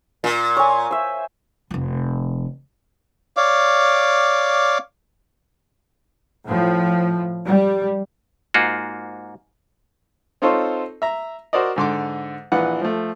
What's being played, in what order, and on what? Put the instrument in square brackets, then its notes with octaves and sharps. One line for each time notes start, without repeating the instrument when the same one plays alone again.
[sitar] A#2
[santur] C#5 G#5
C5 E5
[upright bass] F1 F3
[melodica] C#5 D5 F5 D6
[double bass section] A2 F3
G3
[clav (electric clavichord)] G#2 A#3 F4 F#4
[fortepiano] C4 D#4 F4 A4 C5 C#5
E5 A#5
F#4 A#4 C5 D5 D#5
G#2 D3 C6 D6
A#1 E3 B4 F#5
F3 A3